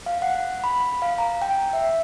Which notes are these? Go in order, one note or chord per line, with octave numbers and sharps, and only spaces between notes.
F5
F#5
B5
F5
A#5
G5
E5